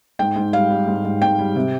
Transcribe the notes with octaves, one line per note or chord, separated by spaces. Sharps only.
G#2 G5
G#2
G3 F5
G3
G#2
G#2
G#2 G5
G3
C3